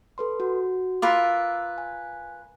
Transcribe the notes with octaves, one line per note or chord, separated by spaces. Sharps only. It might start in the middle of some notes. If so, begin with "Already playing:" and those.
A4 B4 C6
F#4
F4 A#4 B4 D6 E6 A6
G#5